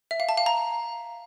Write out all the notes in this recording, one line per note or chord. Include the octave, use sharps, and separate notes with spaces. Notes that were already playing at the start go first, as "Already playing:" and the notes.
E5
F5
A5
F5
A#5